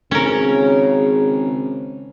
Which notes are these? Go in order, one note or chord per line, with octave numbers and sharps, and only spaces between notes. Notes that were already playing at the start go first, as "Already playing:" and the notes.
G#1 C#3 C#4 A#4